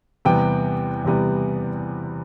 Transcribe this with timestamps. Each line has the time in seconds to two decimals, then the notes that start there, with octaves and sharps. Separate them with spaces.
0.25 E2 C3 G3 B3 G5
1.05 E2 C3 G3 B3